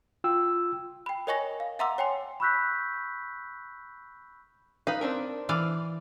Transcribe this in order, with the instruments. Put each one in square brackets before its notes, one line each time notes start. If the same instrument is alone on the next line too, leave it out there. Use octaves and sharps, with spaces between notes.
[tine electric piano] F4 G5 E6
[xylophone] G5 B5
A#4 C#5 D#5 G#5 C#6 A#6
F5
E5 F#5 A#5 C6 D6 E6
C#5 G5 G#5 C6
[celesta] B5 C#6 E6 F#6 G6 B6
[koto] D#4 [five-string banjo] B4 F5
[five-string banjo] C4 D4 A#4
[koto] E3 D5 F5